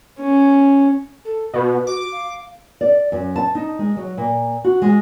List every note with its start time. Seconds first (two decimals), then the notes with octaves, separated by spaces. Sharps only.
0.19 C#4
1.25 A4
1.53 B2 B4
1.87 F#4 D6
2.12 F5
2.81 D5
3.12 F#2
3.36 A5
3.55 D#4
3.79 G#3
3.97 F#3
4.17 A#2
4.64 F#4
4.82 G#3